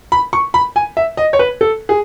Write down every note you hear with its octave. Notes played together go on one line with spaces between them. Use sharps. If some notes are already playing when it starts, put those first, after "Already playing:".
B5
C#6
B5
G#5
E5
D#5
C#5
B4
A4
G#4